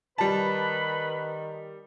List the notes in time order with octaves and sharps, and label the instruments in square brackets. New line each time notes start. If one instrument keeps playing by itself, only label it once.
[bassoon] D#3 [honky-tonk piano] G3 A5 [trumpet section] B4 [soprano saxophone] B5